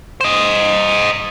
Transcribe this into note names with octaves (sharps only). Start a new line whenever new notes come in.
C5 D#5